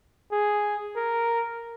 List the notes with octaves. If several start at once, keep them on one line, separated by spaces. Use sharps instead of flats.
G#4
A#4